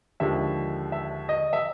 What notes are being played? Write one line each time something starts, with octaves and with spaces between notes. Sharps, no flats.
D#2 D3 F3 G#3 E5
E5
D#5
E5